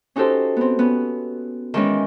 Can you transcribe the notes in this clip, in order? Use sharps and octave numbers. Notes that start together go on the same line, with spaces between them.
C#4 D#4 F#4 G4 A4 C5
B3 C4
B3 C#4
D#3 E3 G#3 C#4